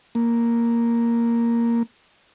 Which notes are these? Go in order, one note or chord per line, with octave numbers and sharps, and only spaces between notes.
A#3